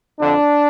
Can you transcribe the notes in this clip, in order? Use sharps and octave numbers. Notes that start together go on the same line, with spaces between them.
F2 D3 D4